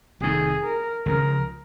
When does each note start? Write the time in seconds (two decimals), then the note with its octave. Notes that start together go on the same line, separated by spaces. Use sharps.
0.20 F1 F2 D#3 G#4
0.64 A#4
1.06 C#2 C#3 F3 A#4